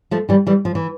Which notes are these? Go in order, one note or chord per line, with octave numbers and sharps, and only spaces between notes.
F3 A3
E3 G3
E3 G3
F3
E3